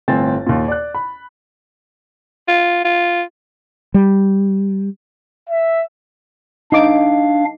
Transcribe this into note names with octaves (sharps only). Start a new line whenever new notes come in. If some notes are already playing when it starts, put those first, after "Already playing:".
G1 A2 C4 G#5 A6
D#2 A#2
D5 F#6
B5
F4
F4
G3
E5
D4 D#4 F5 D6